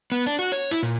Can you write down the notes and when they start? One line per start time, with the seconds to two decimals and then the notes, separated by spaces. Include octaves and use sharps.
0.12 B3
0.26 D4
0.39 F#4
0.52 C#5
0.71 E4
0.83 A#2